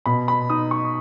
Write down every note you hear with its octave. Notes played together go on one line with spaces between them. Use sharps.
B2 B5
B5
D#4 D#6
C#6